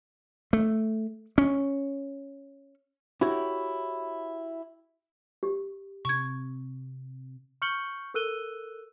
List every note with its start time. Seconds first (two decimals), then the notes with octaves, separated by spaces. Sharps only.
0.53 A3
1.38 C#4
3.21 E4 F#4 G4 C#5
5.43 G4
6.05 C3 C#6 G#6
7.62 C#6 F6 G6 C#7 F#7 G7
8.14 A4 A#4 E6 F#6 D#7 G7